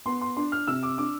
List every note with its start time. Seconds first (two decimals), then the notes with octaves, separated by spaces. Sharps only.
0.06 B3 C6
0.21 C6
0.36 D4 C6
0.52 F6
0.67 C3 E6
0.83 D6
0.98 D4 D6